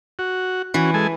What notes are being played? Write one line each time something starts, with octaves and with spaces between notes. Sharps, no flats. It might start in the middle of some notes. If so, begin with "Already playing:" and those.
F#4
E3 C#4 F#4
G#3 A4 G#5